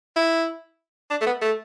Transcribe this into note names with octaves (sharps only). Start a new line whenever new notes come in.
E4
D4
A3
B3
A3